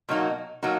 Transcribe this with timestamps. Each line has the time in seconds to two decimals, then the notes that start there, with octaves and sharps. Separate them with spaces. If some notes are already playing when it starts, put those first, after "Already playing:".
0.09 B2 F#3 A#3 D#4 F#4
0.63 B2 F#3 A#3 D#4 F#4